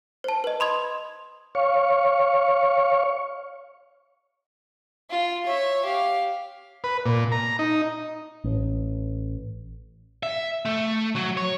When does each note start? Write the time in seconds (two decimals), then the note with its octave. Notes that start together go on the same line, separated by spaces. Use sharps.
0.24 C5 A5
0.44 B4 D#5
0.60 B5 C6 D#6 G#6
1.55 C#5 F5 C#6
5.10 F4
5.46 C#5 E5
5.84 G4 F5
6.84 B4
7.06 A#2
7.32 A#5
7.59 D#4
8.44 A1
10.23 E5
10.65 A3
11.16 F#3
11.37 C#5